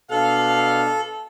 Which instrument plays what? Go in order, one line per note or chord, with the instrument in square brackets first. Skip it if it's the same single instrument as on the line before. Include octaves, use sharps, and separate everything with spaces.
[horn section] B2 D4 F5 [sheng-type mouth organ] A4